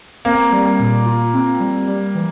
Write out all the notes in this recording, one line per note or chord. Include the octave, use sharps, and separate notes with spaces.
A#3 C4
G3
A#2
F4
C4
G3
G3
E3